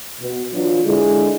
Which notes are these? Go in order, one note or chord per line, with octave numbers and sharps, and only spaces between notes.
B2
E3 F#3 D4 F4
D3 G#3 E4